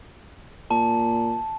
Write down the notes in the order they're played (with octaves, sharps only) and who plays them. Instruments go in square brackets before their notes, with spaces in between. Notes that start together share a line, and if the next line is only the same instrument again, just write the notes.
[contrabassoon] A#2 [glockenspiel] A5